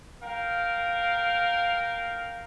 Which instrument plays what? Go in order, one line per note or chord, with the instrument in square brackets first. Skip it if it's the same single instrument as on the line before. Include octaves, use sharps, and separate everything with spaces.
[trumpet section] A#4 F5 G5